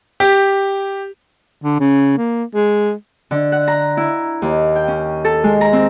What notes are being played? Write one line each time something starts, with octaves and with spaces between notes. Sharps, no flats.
G4
D3
C#3
A#3
G#3
D3
F#5
A#5
E4
D#2
G5
C#4
A4
G#3
A#5
C4